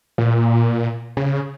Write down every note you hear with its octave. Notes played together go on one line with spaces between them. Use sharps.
A#2
C#3